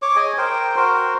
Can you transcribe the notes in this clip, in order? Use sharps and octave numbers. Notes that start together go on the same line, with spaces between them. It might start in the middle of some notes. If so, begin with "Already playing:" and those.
C#5 D6
G#4 D#5 G#5
A#4 C5 G5
F#4 A#4 C5